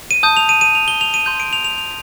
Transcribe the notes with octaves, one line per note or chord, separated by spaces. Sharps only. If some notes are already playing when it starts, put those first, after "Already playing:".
D#7
A5 D#6 G6
F7
D#7
D#7
F7
G7
F7
D#7
C6 G6
D7
F7
F7
F7